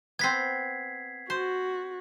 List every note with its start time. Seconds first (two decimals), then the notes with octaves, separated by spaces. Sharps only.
0.19 B3 C4 G#6 B6 C7
1.30 F#4 C5